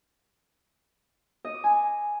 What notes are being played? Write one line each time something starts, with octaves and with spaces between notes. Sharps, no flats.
D#5
D6
G#5